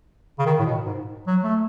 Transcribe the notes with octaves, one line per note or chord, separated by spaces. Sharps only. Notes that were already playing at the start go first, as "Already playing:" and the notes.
C#3
D#3
A2
B2
G#2
F#3
A3